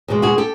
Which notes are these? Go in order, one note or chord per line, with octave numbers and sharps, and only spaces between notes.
E2 B2 G#3
F#4 G#4
G4 A4